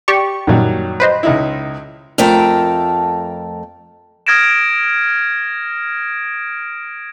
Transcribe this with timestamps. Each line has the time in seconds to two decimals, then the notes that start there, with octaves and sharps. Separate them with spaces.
0.08 G4 D5 C#6
0.47 F#2 A#2 D#3 F#3 G3
1.00 B4 C5 D#5
1.23 C#2 D#4 E4
2.18 F2 A3 A4 A#4 G5
4.27 D#6 F6 G#6 A#6 D7 E7